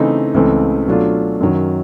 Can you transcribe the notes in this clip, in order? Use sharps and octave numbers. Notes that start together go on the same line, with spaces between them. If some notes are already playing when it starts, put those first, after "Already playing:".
Already playing: C#3 E3 A3 C4 D#4
C#2 C#3 E3 A3 C4
B2 F#3 A3 D4 F4
F#2 D#3 F#3